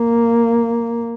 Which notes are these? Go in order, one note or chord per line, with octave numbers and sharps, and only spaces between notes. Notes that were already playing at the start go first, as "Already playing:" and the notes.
Already playing: A#3